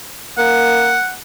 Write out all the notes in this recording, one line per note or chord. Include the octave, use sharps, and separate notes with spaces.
A#3 F#5